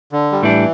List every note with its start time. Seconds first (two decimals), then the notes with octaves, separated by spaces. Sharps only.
0.12 D3
0.32 G3
0.43 A2 E3 G3 D4